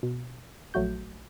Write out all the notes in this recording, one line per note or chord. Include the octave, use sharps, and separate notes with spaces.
B2
A#1 F#3 A3 F#4 G6